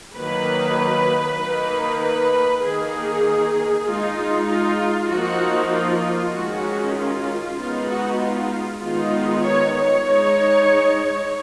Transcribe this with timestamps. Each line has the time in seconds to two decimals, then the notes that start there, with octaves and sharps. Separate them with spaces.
0.15 D#3 F#3 A#3 B4
1.38 D#3 A#3 D#4
2.01 B4
2.62 D#3 A#3 D#4 G#4
3.86 G#3 D#4 F4
4.48 F4
5.09 F3 A#3 D#4 F#4
5.72 F4
6.33 D#3 G#3 C#4 F#4
6.96 F4
7.57 G#3 B3 D#4 F4
7.89 F#4
8.20 F4
8.81 D#3 G#3 B3 D#4 F4
9.43 C#5
9.74 C#5
10.05 G#3 D#4